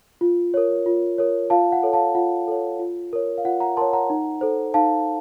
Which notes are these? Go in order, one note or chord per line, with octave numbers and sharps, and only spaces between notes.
F4
A#4 C#5
F4
A#4 C#5
F4 F5 A5
F#5
A4 C#5
F5 A5
F4 F#5
A4 C#5
F4
A#4 C#5
F5
F4 F#5
F#5 A#5
A#4 C#5 A5 C6
F#5 A#5
D#4
A4 C5
D#4 F5 A5